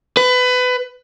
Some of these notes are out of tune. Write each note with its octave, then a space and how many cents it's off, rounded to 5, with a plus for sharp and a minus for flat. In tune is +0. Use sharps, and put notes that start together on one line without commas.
B4 +25